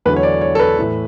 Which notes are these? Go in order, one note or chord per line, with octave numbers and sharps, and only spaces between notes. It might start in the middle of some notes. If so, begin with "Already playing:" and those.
E2 D3 F#3 A3 B4
C#5
D5
C#5
A4
B4
A2 E3 A3